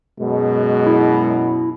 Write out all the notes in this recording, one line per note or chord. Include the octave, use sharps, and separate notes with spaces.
F#2 B2 G#3
E4